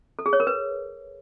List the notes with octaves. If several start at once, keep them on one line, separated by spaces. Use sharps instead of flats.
A4
G#4
C#5
A#4
B4